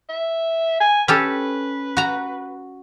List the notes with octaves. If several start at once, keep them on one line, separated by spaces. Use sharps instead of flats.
E5
G#5
C#4 G4 A4 B4
F#4 A#5